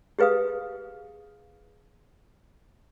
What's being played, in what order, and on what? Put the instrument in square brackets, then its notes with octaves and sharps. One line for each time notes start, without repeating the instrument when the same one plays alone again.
[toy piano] G4 G#4 B4 F5 D#6